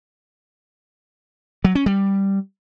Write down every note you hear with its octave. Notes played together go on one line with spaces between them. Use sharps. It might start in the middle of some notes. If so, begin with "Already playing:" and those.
F#3
C#4
G3